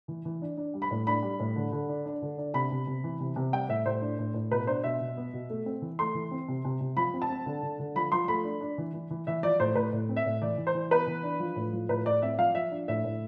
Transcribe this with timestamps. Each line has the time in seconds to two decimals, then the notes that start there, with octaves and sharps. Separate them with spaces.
0.08 E3
0.25 E3
0.42 D4
0.57 D4
0.74 G3
0.82 B5
0.91 A2
1.07 D4 B5
1.23 G3
1.40 A2
1.56 D3
1.72 D3
1.89 D4
2.06 D4
2.22 D3
2.38 D4
2.54 C3 B5
2.71 C3
2.87 C3
3.04 E3
3.20 C3
3.36 C3
3.53 G3 G5
3.69 A2 E5
3.85 A2 C5
4.02 D4
4.19 A2
4.34 A2
4.51 B2 B4
4.67 D4 C5
4.84 B2 E5
5.00 B2
5.17 B3
5.33 B2
5.50 A3
5.66 C4
5.82 E3
5.99 A3 C6
6.15 E3
6.31 C4
6.48 C3
6.65 C3
6.81 C3
6.97 F3 B5
7.14 C4
7.22 A5
7.30 C4
7.46 D3
7.63 D3
7.79 D3
7.95 F3 B5
8.12 F3 C6
8.28 A3 B5
8.44 D4
8.61 D4
8.78 E3
8.94 E3
9.10 E3
9.27 E3 E5
9.43 F3 D5
9.60 A2 C5
9.75 A2 B4
9.93 A2
10.09 C4
10.16 E5
10.26 A2
10.42 E3 D5
10.57 E3
10.67 C5
10.74 E3
10.91 B3 B4
11.07 E3
11.23 D4
11.40 F3
11.56 A2
11.73 F3
11.89 A2 B4
12.05 A2 D5
12.22 C4 E5
12.38 F3 F5
12.55 F3 E5
12.71 D4
12.88 A2 E5
13.04 A2